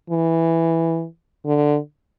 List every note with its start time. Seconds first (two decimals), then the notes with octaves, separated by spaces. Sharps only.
0.10 E3
1.46 D3